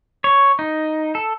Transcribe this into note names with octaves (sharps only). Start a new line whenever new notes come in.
C#5
D#4
A4